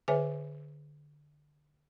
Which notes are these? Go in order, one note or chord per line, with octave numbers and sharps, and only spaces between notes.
D3 G#4 B4 C#5 E5 G#5